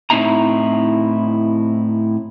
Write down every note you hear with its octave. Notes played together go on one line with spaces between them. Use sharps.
A2 C4 D#4 E4 A#5